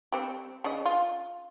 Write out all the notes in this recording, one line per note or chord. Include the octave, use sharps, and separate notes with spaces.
G3 C4 G4
C#3 D5 D#5
F4